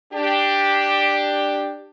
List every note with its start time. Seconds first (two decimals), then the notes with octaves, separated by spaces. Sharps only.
0.12 D4 G4